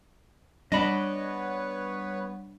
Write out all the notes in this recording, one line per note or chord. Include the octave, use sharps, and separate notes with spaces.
G3 B3 D4 B4 C#5 D#5 B5